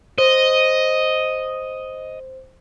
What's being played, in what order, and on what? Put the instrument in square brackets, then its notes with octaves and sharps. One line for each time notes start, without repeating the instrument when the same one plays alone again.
[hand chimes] C5 [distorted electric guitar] D#5